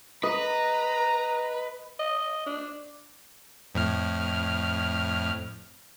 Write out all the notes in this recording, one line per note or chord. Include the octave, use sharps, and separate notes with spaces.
B4 D#5 A#5
D#5
D4
F2 A2 F6